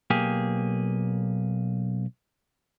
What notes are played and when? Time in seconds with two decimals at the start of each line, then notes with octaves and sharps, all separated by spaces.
0.10 B1 A#3 G4 G#4